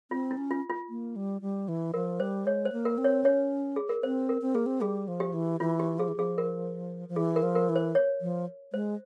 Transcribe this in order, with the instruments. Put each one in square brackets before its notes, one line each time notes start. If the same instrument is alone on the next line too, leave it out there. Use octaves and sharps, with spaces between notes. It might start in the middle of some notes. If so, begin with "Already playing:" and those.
[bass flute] C4 [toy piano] F4
[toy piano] E4
[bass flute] C#4
[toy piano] F4
F4
[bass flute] A#3
G3
G3
E3
[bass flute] F3 [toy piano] A#4
[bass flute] G3 [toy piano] C5
[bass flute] G#3 [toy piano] C#5
[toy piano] C5
[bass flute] A#3
[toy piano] A#4
[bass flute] C4
[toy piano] C#5
[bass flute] C#4 [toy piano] C#5
[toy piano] G#4
A#4
[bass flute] C4 [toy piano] C5
[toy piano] A#4
[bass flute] C4
[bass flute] A#3 [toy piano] G#4
[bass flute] C4
[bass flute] G3 [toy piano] G#4
[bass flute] F3
[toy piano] G4
[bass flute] E3
[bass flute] E3 [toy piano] F4
[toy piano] G4
[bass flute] F3 [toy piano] G#4
[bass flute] E3
[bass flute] F3 [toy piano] G#4
[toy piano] A#4
[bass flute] F3
[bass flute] E3 [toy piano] G#4
[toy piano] A#4
[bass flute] F3
[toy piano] A#4
[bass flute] E3
[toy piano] C5
C#5
[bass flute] F3
[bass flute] G#3 [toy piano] C5